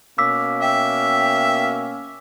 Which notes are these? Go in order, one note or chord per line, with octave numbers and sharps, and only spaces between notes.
B2 A#3 C#4 D6 E6 B6
E5 G5